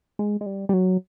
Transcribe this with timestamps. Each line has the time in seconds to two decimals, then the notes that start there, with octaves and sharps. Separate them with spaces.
0.19 G#3
0.41 G#3
0.46 G3
0.69 G3
0.74 F#3